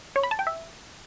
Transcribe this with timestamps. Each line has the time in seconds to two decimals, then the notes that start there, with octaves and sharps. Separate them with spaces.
0.16 C#5
0.23 B5
0.31 A5
0.39 G5
0.47 E5